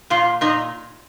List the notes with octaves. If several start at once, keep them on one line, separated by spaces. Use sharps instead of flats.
A#2 F4
A#2 D#4